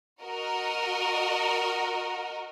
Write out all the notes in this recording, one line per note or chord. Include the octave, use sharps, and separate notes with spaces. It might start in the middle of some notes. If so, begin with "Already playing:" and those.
F#4 A#4 D#5